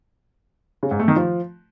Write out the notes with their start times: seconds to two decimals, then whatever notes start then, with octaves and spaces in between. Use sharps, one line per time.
0.83 C#3
0.91 G#2
0.99 A3
1.08 D#3
1.16 F3